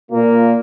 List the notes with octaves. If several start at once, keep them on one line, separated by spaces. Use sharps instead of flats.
A#2 A#3